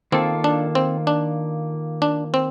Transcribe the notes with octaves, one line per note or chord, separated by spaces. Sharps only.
D#3 A#3 C4 F4 A4
D4
C4
D4
D4
C4